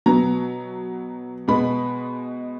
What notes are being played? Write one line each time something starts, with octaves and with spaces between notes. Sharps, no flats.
B2 F#3 B3 A#5
B2 G#3 B3 B5